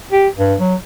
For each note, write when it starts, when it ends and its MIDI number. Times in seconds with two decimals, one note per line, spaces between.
0.12 0.28 67
0.38 0.55 43
0.60 0.75 54